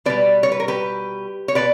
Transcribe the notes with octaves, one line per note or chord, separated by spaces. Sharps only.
B2 G3 B4 D5
C#5
B4
A#4
G4 B4
C#5
B2 B4 D5